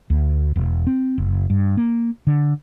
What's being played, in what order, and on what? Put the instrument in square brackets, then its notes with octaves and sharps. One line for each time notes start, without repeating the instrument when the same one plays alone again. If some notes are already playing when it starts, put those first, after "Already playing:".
[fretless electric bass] D2
E1
C4
F#1
G2
A#3
D3